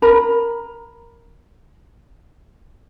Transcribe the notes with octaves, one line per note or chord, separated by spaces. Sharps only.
A#4 A#5 B5